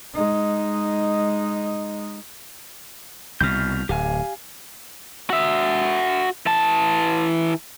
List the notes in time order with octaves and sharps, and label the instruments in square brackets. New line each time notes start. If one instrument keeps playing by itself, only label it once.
[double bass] G#3 D#4
[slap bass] C2 B2 [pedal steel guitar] F6 G6
[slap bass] D1 [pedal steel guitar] G4 F5 G#5
[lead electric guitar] F#4 E5
E3 A5